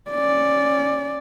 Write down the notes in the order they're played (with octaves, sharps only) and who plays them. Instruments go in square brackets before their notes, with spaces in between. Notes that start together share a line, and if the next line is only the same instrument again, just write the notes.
[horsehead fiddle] C#4 D5